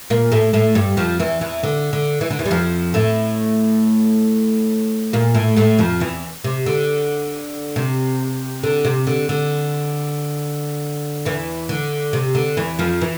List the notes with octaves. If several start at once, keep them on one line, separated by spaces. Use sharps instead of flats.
A#2 A#3
A2 A3
A2 A3
G2 G3
F2 F3
E2 E3
E2 E3
D3
D3
E3
D3
E2 E3
G3
F2 F3
A2 A3
A#2 A#3
A2 A3
A2 A3
F2 F3
E2 E3
C3
D3
C3
D3
C3
D3
D3
E2 E3
D3
C3
D3
E2 E3
F2 F3
E3